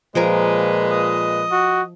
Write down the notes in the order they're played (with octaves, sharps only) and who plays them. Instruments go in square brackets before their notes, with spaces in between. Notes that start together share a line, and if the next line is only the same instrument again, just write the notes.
[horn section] A#2 G#3 B4 [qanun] F3 G#4 A#4
[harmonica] D#5
[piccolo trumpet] F#4